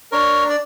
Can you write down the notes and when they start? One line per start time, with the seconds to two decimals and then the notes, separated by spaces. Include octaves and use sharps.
0.12 D4 A#4 C#5
0.49 D5